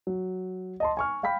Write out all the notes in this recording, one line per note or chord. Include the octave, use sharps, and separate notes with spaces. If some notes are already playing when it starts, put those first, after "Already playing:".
F#3
D#5 A5 C6
G#5 C#6 F6
F5 G5 B5 B6